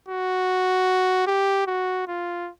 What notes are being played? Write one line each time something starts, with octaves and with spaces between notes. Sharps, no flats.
F#4
G4
F#4
F4